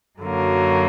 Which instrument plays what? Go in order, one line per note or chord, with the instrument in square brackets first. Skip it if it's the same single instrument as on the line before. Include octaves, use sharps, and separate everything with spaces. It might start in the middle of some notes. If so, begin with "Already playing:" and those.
[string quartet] F#2 D3 F#3 A#3